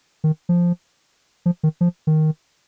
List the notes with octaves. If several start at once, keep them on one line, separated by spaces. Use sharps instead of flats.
D#3
F3
F3
D#3
F3
D#3